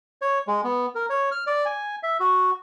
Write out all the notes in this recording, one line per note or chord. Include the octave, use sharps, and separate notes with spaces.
C#5
G#3
B3
A#4
C#5
F6
D5
G#5
E5
F#4